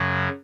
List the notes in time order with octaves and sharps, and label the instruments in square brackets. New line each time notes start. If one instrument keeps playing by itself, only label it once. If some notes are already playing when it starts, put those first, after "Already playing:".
Already playing: [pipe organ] F#2 C#3 F#3